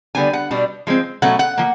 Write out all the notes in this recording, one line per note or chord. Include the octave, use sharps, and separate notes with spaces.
D3 G3 B3 D4 G#5
F#5
B2 G3 B3 D4
F3 G#3 C4
B2 F#3 A3 C#4 F#5
F#5
F3 A#3